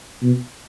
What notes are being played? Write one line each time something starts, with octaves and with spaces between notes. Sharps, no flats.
B2